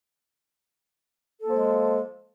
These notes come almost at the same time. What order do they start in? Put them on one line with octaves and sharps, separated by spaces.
A4 A#3 F3 G#3